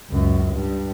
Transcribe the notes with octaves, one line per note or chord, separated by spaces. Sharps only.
C#2 F#2
G2